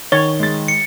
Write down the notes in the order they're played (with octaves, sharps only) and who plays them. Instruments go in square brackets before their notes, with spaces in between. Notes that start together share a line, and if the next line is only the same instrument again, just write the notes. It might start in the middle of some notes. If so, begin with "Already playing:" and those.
[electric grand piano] D#3 [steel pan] C#5 [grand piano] C#6 A6 [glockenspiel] G7
[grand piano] G#3 A6
[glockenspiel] C#7